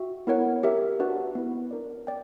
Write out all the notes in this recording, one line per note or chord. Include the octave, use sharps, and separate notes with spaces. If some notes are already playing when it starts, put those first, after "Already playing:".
Already playing: F#4 E5 G5
B3 E4 A#4 C#5 F#5
G4 A#4 E5
D4 F#4 B4 D5 F#5
B3 E4 B4
D4 A#4 D5
D5 G5